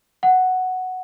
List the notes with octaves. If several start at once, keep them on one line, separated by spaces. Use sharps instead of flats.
F#5